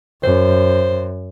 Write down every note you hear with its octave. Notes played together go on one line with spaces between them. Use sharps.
F#2 C5